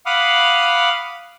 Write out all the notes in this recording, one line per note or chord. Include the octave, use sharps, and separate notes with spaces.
F5 F#5 B5 D6 D#6 F6